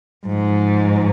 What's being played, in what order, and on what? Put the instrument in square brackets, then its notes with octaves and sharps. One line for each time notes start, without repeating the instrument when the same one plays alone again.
[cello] G#2 [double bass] F3